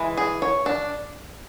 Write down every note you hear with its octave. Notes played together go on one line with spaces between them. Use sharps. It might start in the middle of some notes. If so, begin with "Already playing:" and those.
Already playing: E3 G#3
G#4
C#5
D4